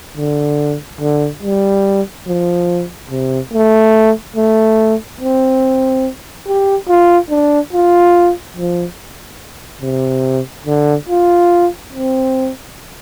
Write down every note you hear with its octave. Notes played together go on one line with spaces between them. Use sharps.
D3
D3
G3
F3
C3
A3
A3
C4
G4
F4
D4
F4
F3
C3
D3
F4
C4